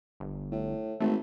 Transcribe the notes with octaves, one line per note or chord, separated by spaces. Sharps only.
G1
A2
G#1 A3